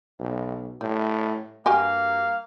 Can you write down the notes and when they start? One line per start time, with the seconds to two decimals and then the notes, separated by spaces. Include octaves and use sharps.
0.20 B1
0.81 A2 G3
1.66 G2 A#3 F#4 G4 F5 G#5